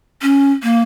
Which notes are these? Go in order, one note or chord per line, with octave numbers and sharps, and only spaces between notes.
C#4
A#3